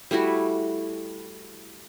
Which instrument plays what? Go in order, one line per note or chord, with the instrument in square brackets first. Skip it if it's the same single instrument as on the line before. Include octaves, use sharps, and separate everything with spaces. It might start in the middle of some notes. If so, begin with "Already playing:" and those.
[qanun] G3 A3 E4 F#4